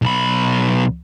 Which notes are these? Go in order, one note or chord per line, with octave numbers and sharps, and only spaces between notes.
B1 B5